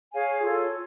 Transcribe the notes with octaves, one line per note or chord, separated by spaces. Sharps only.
G#4 C#5 F5 G#5
F4 A4 C#5